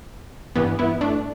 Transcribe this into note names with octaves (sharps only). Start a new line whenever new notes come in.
G2 E3 B3
B3 E4
A3 D4